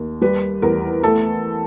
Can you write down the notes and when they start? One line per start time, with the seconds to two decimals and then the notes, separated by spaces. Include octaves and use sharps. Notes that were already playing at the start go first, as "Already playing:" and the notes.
Already playing: D#2
0.21 G3 B4
0.62 E2 A#4
1.03 A3 A4